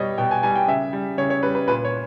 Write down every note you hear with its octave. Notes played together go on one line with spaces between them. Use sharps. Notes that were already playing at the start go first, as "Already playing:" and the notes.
Already playing: B2 G3 C#5 D#5
B2 G5
G#5
G3 G#5
G5
C#3 E5
G3
C#3 C#5
C#5
G3 B4
B4
A#2 B4
C#5